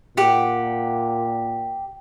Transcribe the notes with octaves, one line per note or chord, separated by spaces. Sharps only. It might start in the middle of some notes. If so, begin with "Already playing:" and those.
A#2 G4 F#5